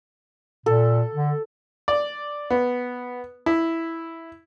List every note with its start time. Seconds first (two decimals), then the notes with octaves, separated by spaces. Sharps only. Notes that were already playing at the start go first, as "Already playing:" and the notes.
0.66 A#2 A4
1.14 D3
1.88 D5
2.50 B3
3.46 E4